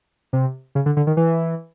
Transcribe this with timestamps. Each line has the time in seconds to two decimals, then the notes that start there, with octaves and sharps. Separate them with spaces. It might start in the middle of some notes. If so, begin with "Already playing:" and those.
0.33 C3
0.75 C#3
0.86 D3
0.97 D3
1.07 D#3
1.17 E3